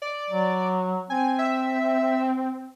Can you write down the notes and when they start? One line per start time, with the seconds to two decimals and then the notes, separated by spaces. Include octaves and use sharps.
0.02 D5
0.30 F#3
1.10 C4 G#5
1.39 E5